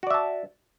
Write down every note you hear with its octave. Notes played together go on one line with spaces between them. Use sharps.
F#4 D5 E5 A5